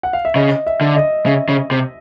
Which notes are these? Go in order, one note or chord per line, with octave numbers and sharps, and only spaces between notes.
F#5
F5
E5
C#3 D#5
E5
D3
D#5
C#3 E5
C#3
C3